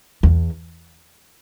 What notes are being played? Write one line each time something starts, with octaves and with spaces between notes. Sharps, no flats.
E2